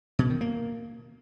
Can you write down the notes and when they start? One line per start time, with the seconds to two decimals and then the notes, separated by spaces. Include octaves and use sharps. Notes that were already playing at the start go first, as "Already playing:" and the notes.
0.19 B2
0.30 D#3
0.41 A#3